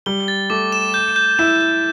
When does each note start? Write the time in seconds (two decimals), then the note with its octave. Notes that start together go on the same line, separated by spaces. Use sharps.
0.06 G3 G7
0.28 A6
0.50 A3 D6
0.72 E7
0.94 G6
1.16 G6
1.39 E4 E7
1.61 G6